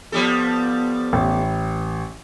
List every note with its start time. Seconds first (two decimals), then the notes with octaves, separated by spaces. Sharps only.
0.12 F3 G3 B3 A4
1.13 A1